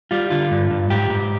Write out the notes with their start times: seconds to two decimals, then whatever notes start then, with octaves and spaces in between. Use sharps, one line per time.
0.11 G3 F4
0.30 D3 F4
0.51 G2
0.71 G2
0.90 G#2 G4
1.10 G#2